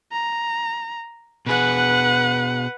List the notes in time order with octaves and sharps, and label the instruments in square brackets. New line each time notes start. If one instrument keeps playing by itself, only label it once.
[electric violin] A#5
[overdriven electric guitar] B2 G#4 [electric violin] B4 F#5